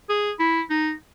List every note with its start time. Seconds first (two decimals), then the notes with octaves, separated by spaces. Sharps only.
0.09 G#4
0.40 E4
0.70 D#4